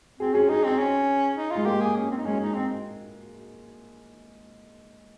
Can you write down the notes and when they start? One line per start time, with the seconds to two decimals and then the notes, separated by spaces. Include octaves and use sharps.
0.20 C4 G#4
0.34 C#4 G#4
0.49 D#4 G#4
0.64 C4
0.78 C#4
1.36 D#4
1.51 G#3 F4
1.66 A#3 G4
1.81 G#4
1.96 C#4
2.10 C4
2.18 D#4
2.25 G#3 C#4
2.40 D#4
2.54 C4